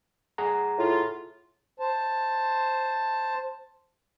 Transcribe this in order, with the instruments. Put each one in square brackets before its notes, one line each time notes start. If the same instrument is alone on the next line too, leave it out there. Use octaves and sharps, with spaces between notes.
[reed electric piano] G#4 F#5 A#5
[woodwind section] A2 F4
[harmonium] C5 A5